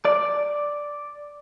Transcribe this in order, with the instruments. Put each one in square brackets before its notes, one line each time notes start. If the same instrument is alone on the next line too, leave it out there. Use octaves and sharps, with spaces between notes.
[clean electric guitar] D5